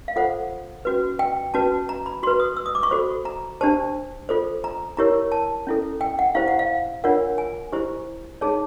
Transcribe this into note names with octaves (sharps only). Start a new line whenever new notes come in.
F5
F4 A4 C5 F#5
C#4 F#4 B4
G5
C#4 F#4 B4 A5
A#5
B5
F#4 B4 C6
D#6
E6
D#6
D6
C#6
F#4 A4 C5 B5
A#5
D4 G4 C5 A5
F4 A4 C5
A#5
E4 G4 A#4 C#5 A#5
A5
C#4 E4 A4
G5
F#5
E4 G4 C5 F5
F#5
F5
D4 F4 A#4 C#5 F#5
G#5
E4 G4 C5
D#4 G#4 C#5 A5